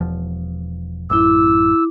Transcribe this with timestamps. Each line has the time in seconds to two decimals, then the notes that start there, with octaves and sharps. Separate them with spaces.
0.01 E1 E2 F3
1.10 A1 F#2 E4 D6 E6